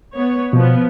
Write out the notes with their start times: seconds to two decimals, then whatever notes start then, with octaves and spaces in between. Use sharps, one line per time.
0.15 B3 C#5
0.53 B2 F3 B3